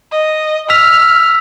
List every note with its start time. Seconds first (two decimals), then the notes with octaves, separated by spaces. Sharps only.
0.12 D#5
0.70 E6 F6 B6 F7